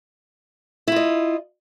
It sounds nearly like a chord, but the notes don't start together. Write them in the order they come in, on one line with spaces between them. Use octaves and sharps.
E4 F4 D#5